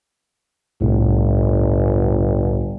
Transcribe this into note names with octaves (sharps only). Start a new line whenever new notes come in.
G1 C2 A2